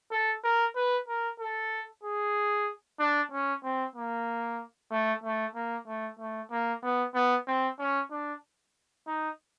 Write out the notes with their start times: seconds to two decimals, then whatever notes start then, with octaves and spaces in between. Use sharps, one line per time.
0.11 A4
0.44 A#4
0.75 B4
1.08 A#4
1.40 A4
2.03 G#4
2.99 D4
3.31 C#4
3.63 C4
3.95 A#3
4.91 A3
5.23 A3
5.55 A#3
5.87 A3
6.19 A3
6.51 A#3
6.83 B3
7.14 B3
7.47 C4
7.79 C#4
8.11 D4
9.07 D#4